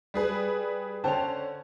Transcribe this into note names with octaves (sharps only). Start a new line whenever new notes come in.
G3 G#4 B4
D3 C#4 C5 G5 A5 F7